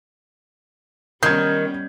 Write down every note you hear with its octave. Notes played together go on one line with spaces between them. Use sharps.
D#3 G3 B3 C#4 G6 G#6